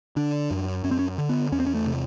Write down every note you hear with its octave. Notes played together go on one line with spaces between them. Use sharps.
D3 D4
F#2
F#2 C#4
C4
C#4
D3
B3
E2 C#4
C4
C#4
A3
C3